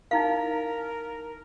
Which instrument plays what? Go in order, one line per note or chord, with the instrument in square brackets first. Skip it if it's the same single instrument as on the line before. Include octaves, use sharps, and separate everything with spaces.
[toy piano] D#4 E4 F5 [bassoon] A#4